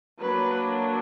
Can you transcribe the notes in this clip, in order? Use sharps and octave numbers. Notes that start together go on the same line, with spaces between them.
F#3 A#3 D4 B4